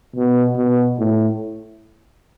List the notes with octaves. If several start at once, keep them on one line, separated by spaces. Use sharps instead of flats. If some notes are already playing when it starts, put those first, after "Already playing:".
B2
B2
A2